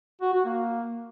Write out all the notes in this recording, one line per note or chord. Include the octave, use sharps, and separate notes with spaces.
F#4
F#4
A#3